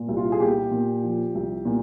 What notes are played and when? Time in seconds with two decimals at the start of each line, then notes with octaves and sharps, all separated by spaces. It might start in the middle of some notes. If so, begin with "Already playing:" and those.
Already playing: A#2
0.09 C2
0.17 F4
0.32 G#4
0.40 A#2 G4
0.71 A#2
1.03 F3
1.35 C2
1.65 A#2